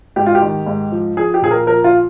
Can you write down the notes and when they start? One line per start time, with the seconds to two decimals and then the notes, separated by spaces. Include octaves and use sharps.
0.16 G#2 G4
0.26 F4
0.35 G4
0.42 D#3
0.66 G#2
0.92 F3
1.17 F3 G#4
1.34 G4
1.42 A#2 G#4
1.51 A#4
1.67 F3 A#4
1.84 F4